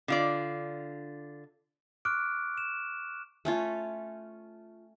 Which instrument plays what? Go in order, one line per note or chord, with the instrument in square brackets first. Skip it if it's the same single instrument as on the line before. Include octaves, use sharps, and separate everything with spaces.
[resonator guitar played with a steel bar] D3 F4 D5
[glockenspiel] C#6 D6 F6 F#6 D7
E7
[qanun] A3 C#4 F4